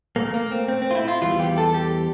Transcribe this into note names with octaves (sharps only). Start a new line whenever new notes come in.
A#2 A3 A#3
A#3
C4
C4
C4
F4
E4
F4
E2 E3 G3 F4
G4
A4
G4